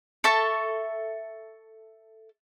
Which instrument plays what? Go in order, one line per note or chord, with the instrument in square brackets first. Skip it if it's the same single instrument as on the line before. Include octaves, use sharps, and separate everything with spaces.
[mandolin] A4 E5 C#6